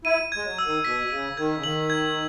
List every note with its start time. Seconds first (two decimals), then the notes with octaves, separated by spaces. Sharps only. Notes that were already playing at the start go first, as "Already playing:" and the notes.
0.05 E4 D#7
0.32 G#3 G#6
0.45 F#3
0.58 E6
0.65 D#3
0.84 B2 B6
1.10 C#3 D#7
1.37 D#3 G#6
1.55 C#3
1.64 D#3 F#7
1.90 G#6